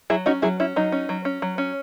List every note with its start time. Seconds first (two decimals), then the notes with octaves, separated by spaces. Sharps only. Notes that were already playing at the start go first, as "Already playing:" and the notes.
0.10 F#3 E4 G#4
0.26 C#4 D#4 F#4
0.42 F#3 E4 G#4
0.60 C#4 E4
0.76 F#3 D#4
0.92 C#4
1.09 F#3
1.25 C#4
1.42 F#3
1.58 C#4